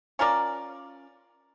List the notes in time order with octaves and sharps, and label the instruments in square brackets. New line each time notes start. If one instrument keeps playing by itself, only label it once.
[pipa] C#4 F4 A#4 D5